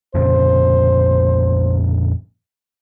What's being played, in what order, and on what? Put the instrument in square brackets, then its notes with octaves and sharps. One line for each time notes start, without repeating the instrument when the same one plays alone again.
[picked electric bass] F2 A#2 C#3 [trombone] C5